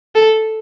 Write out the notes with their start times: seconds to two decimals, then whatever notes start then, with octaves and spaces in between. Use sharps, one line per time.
0.15 A4